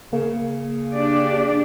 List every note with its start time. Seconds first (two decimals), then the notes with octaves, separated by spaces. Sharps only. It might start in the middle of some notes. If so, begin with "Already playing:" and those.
0.13 C#3 A#3
0.93 D4 G4 D5